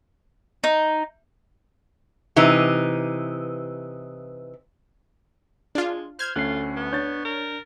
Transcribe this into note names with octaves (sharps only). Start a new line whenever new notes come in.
D#4
C3 E3 D#4
G#3 D4 F4
C5 F6 G#6
D2 A3 C#4 F4 F#6 C7
B3
D4 C#5 G6 A6
A#4